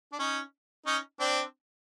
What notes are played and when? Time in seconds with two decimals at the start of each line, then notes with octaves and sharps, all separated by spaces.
0.13 D4
0.19 C#4 D#4
0.87 C#4 D#4
1.20 C4 D4